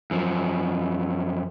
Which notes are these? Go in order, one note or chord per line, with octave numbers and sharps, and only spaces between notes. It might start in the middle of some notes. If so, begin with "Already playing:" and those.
F#2 F3